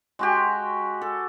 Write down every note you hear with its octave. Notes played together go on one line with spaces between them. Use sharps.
G#3 F#4 G4
A4